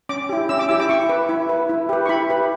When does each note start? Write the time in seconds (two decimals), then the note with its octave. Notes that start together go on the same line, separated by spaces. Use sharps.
0.09 C#4 D6
0.29 E4 G4
0.49 C#4 E6
0.59 D6
0.69 E4 G4 E6
0.80 D6
0.89 E4 C#6
1.09 B4
1.29 E4
1.49 B4
1.69 E4
1.89 G4 B4
2.05 C#6
2.09 E4 B5
2.30 G4 B4